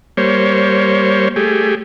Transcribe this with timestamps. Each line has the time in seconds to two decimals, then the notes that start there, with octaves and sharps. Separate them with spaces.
0.17 G3 A#3 C5 C#5
1.36 A3 G4 G#4